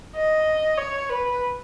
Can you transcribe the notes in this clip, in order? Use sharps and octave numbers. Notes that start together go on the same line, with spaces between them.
D#5
C#5
B4